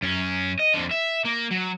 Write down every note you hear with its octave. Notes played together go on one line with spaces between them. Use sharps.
F#2 C#4
D#5
F2 D3
E5
A#3
F#3